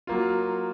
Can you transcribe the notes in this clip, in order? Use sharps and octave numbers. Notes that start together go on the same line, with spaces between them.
F#3 A#3 F4